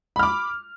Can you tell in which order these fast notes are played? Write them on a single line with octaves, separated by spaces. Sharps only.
B5 F6 D6